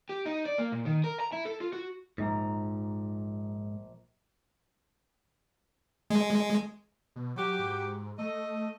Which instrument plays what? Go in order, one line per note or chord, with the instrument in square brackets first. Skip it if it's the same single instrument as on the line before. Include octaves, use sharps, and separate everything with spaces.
[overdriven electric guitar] G4
D#4
D5
A#3
A#2
D#3
A#4
A#5
E4
A4
F4
F#4
[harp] A#1 A#5 [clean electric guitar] G#2
[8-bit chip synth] G#3
[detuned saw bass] B2
[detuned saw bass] F#3 [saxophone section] F#4 G4
[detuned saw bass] G#2
[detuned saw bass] A3 [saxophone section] A4 D#5